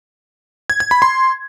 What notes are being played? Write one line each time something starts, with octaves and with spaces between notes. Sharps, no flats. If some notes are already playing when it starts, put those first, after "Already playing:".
G#6
G#6
B5
C6